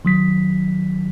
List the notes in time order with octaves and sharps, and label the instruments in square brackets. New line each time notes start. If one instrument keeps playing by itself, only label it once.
[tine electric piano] D#3 F#3 B6